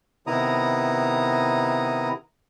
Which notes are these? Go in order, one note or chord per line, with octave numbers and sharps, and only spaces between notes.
C3 D#3 B3 E4 A#5 D#6